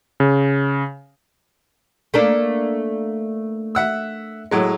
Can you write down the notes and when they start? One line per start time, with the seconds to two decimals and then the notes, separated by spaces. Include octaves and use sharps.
0.20 C#3
2.14 A3 A#3 D4
3.75 E5 F#5 E6
4.51 A2 F#3 G#3